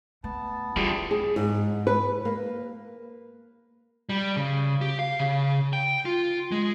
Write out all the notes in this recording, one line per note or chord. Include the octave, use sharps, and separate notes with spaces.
A3 B3 A5
E2 D3 G3 E4 F4 G#4
G#4
G#2
B4
A#3
G3
C#3
G4
F5
C#3
G5
F4
G#3